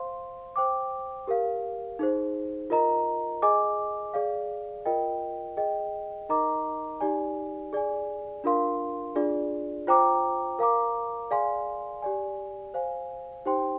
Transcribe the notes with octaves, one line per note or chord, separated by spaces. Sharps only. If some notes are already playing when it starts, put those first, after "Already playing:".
Already playing: C5 F5 C6
C5 G5 D6
G4 A#4 F5
D#4 G#4 C5
F4 A#4 D#5 A#5
G#4 D#5 G#5 D6
G#4 D5 F5
F4 A#4 D#5 G5
G#4 D#5 G5
D#4 A#4 D#5 A#5 D6
D#4 G4 D5 G#5
G#4 D5 G#5
D4 F4 A#4 F5 C6
D4 F4 G#4 D5
F4 C5 G5 A#5 D6
A#4 F5 A#5 D6
G#4 D5 F5 G#5 C6
G4 D5 G#5
C5 F5 G#5
D#4 G4 C5 G5 C6